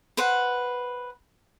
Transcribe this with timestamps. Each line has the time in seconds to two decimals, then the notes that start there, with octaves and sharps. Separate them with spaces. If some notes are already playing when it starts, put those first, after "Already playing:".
0.17 B4 C5 F#5